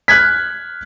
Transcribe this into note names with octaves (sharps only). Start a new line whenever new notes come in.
F6 F#6 G#6 B6